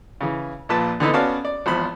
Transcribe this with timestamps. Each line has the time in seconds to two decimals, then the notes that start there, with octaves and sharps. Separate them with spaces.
0.21 C#3 E3
0.69 A#1 A#2 F4 B4 A5
1.00 D3 E3 B3 D#4 A4 B4
1.13 B3 C#4 F#4 D5 F5 A5
1.45 D5
1.66 G#1 E2 F3 B5